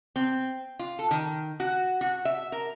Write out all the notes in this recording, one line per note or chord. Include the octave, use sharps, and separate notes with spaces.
C4
F4
A4
D#3
F#4
F#4
E5
A#4